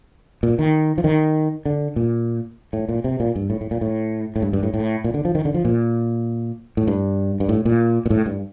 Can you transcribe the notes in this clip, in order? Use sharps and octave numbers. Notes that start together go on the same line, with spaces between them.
A#2
D#3
F3
D#3
D3
A#2
A2
A#2
C3
A#2
G2
A2
A2
A#2
A2
A2
G2
G2
A2
A2
A#2
D3
F3
D#3
D3
F3
A#2
A2
G2
G2
A2
A#2
A#2
A2
G2